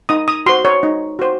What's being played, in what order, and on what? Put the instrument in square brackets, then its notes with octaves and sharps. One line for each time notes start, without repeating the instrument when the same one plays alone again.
[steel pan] D#4 D#6
D#6
F#4 C5 C6
C#5
D#4
F#4 C5